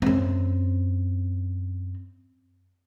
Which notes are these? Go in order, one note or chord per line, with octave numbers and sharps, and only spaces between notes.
F#2 C4